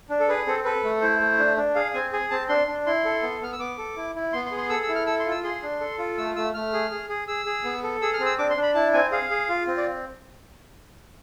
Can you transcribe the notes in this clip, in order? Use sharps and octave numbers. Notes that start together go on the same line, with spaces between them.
D4
A4
G#4 B4
C4 A4
A4 B4
A3
E4 C5
A3
D4
D4
G#4 F5
C4 G#5
G#4 G#5
C4 A5
D4 C6
D4
E4 C6
A4
B3
B3 F6
E6
B3 D6
A4
E4
E4
B3 C6
C6
G#4
C6
A4 E6
E6
E4
F6
A4 E6
C6
F4
E6
G#4 C6
D4
A4
F4
A3 E6
A3 E6
A3 F6
G#4
G#4
G#4
G#4 E6
G#4
B3
A4
G#4 E6
F6
C4
E6
D4 D6
C6
D4
B5
E4 A5
C4 G#5
G#4 F5
G#4
F4
C4
D5